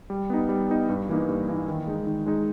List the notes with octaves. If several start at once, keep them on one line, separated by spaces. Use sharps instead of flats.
G3
B3 D#4
G3
B3 D#4
G2
E3 A#3 D#4
G2
E3 A#3 D#4
D#3
G#3 D#4
D#3
G#3 D#4